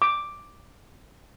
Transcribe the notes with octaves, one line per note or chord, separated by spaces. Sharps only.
D6